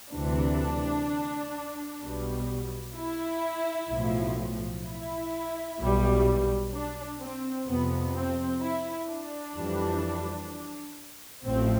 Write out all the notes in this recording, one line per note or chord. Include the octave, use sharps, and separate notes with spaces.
D2 C3 E3 D4
B1 B2 G3
E4
B1 A2 F3
E4
B1 B2 G3
D4
C4
F2 C3 F3 B3
C4
E4
D4
F2 E3 G3
A1 A2 F3 C4